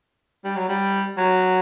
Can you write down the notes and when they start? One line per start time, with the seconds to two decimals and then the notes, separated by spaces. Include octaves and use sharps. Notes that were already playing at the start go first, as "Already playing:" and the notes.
0.44 G3
0.55 F#3
0.68 G3
1.17 F#3